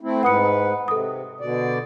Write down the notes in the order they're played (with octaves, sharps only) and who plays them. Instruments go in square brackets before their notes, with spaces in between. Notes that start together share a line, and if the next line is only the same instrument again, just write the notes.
[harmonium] A3 C4 E4
[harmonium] G#2 B4 [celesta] F#5 D#6 C#7
[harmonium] C3 [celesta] A4 D#6
[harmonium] B2 D3 D5